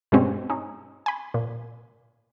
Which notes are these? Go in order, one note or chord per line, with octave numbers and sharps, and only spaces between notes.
G2 B2 G#3 C4 C#4
C#4 D#4
G#5 B5
A#2